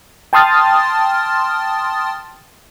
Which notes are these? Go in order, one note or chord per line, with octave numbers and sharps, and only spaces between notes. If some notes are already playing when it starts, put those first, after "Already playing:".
G5 A5 C6 D#6 F6 A6